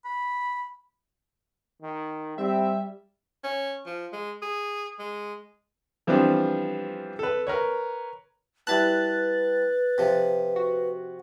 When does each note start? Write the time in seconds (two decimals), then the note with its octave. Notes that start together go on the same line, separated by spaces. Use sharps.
0.05 B5
1.82 D#3
2.38 G3 C4 E5
3.44 C#4
3.86 F3
4.13 G#3
4.42 G#4
4.99 G#3
6.07 E3 F3 G3 B3 C4 D4
7.19 A4 B4
7.47 A#4 B4 C#5
8.67 G3 E4 B4 A5 F#6 A6
9.98 C3 F3
10.56 F#4